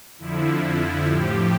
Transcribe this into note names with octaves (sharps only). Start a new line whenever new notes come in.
F2 D3 F3 E4
A2 F3 G4